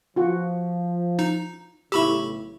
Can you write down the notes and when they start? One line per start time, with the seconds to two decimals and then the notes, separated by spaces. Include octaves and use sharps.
0.16 F3 F4 F#4
1.19 D#4
1.92 B1 A2 C#3 E4 G4 B5 C#6 E6